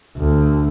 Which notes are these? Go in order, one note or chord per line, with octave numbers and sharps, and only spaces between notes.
D2